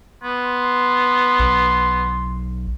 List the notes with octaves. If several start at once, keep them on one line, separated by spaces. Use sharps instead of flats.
B3 C6
B1